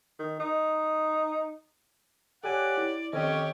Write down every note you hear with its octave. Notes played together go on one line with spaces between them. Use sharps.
D#3
D#4
G4 A4 C#5 D5 F#5 G#5
E4
F2 D#3 C4 C#4 G4 C#5 D#5